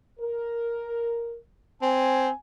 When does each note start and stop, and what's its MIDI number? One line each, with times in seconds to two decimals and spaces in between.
0.20 1.36 70
1.82 2.29 60
1.82 2.35 80